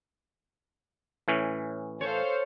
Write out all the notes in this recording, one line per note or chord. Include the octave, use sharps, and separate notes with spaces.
A2 E3 C#4
A4 C5 C#5 F5